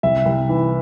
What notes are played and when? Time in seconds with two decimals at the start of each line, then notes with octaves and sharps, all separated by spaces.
0.03 C2 E5
0.26 C2
0.49 E3